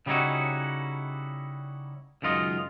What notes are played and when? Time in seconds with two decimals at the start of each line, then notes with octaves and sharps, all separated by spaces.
0.06 C#3 G3 C#4 D#4 E4 F#4
2.22 C#2 F#2 D#3 F4 D#5